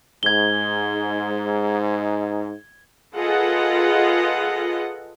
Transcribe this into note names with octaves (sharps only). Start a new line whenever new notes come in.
G#2 G#6 G7
F4 G#4 A4 B4 D#5 F#5